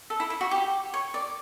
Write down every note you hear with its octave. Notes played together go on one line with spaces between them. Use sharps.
A4
E4
E4
F#4
G4
C#5
D5